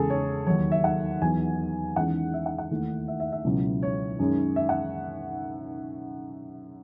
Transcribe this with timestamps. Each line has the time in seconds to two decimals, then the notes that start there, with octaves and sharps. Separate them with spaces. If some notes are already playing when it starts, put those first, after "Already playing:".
Already playing: E2 C#3 G#3 G#4 A4
0.10 C#5
0.47 D#2 D#3 F#3 C#5
0.72 E5
0.84 F#5
1.22 E2 D#3 F#3 B3 G#5
1.96 E2 D#3 G#3 C#4 E4 F#5
2.34 E5
2.46 F#5
2.58 F#5
2.71 D#2 D#3 A3 E4
3.08 E5
3.20 E5
3.32 E5
3.45 C#2 B2 F#3 C#4 E4
3.83 C#5
4.19 F#2 D#3 G#3 C#4
4.56 E5
4.69 F#5